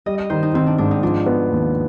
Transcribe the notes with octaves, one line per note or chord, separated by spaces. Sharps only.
G3 D#5
D#5
D#3 C5
D#4
D#3 C4
D4
G#2 D4
D#4
F3 D4
B3
D#2